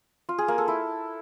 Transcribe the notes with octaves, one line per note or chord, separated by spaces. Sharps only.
F4
G#4
A#3
A4
E4